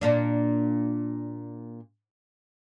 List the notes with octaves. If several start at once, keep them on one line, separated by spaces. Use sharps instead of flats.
A#2 A#3 D4